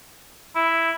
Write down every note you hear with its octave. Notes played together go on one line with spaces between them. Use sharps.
E4